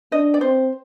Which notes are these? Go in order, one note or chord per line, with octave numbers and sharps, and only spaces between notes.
D4 D#5
D5
C4 C5